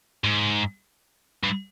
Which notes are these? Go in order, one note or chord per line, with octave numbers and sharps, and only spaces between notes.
G#2
G2